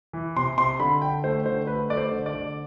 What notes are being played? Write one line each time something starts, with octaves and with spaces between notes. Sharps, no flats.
E3
C3 C6
C3 C6
D3 B5
D3 G5
A3 C5
D3 C5
A3 B4
A3 D5
C5
D3
D5
D3